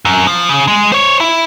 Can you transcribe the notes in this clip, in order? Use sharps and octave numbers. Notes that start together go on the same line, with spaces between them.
F#2
F3
C#3
G#3
C5 C#5
E4